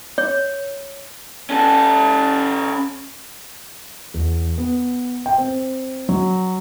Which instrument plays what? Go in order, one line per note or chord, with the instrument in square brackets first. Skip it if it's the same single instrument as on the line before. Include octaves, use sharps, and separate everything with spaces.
[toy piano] C#5
[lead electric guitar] C#4 A4
[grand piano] E2
B3
G5
C4
F#3